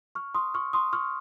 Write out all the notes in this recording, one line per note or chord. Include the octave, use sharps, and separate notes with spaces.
C#6 F6
C6 D#6
C#6 F6
C6 D#6
C#6 F6